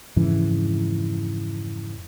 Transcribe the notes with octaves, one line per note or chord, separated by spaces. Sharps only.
F2 G#2 C#3 E3